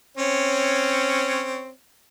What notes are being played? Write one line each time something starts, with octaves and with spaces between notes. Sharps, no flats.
C4 C#4 C#5